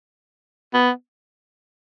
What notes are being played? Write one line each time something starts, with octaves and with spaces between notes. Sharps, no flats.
B3